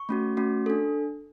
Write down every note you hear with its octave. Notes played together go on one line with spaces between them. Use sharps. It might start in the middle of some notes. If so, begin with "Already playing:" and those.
Already playing: C#6
A3 C#4 F#4
A3 C#4 F#4
D4 A4